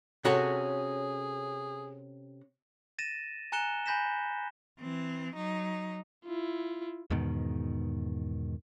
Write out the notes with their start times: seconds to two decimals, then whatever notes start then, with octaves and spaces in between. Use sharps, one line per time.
0.25 C3 C#4 F#4 G#4 A4 C#5 A#5
2.99 A6 A#6 D#7 E7
3.52 G#5 A#5 F#6 C#7 E7 G7
3.86 G#5 B5 G6 A#6 B6 E7
4.79 E3 C4
5.35 F#3 D#4
6.25 E4 F4
7.10 E2 G#2 B2 D#3